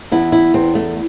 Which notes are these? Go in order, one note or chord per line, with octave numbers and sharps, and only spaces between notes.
E2 E4
E4
E2 C4
A3